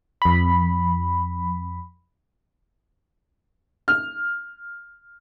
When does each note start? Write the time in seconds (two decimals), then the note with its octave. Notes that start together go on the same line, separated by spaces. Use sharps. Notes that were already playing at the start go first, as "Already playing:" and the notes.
0.22 F2 B5
3.88 F6